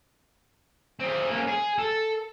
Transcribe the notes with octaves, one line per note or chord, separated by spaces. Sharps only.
C4 G#4
A#3 C#4
G#4
A4